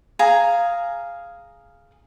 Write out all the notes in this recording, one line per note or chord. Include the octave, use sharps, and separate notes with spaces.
G#4 F5 A#5